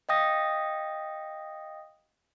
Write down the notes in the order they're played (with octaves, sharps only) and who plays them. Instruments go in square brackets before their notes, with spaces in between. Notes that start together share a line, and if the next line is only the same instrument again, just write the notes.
[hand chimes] D#5 F5 G5 D#6 A#6